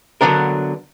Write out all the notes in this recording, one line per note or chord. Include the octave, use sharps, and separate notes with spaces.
D3 F#3 B3 D4 A#4